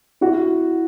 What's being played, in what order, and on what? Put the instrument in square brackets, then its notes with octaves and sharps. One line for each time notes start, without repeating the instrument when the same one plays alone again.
[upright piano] E4 F#4